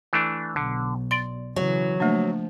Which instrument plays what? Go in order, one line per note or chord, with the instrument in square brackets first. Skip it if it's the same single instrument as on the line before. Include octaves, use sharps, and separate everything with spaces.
[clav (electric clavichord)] E3 A3 D4
[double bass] B1 [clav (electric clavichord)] D3
[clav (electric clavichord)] D5 [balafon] C6
[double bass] C#3 E3 [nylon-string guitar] F#3
[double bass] F3 [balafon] A3 A#3 D4